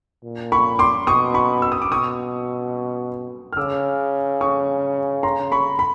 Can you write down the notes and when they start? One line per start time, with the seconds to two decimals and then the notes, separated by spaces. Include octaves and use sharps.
0.23 A#2
0.52 B5 C#6
0.79 C6 D6
1.07 B2 C#6 D#6
1.34 B5 C#6
1.62 E6
1.72 D#6
1.82 D6
1.90 B2 C#6 D#6
3.53 F6
3.57 C#3 D6 E6
4.41 C#6 D#6
5.23 A#5 C6
5.52 B5 C#6
5.79 B5